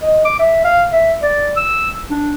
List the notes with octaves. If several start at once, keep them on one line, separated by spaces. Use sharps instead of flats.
D#5
D6
E5
F5
E5
D5
E6
D4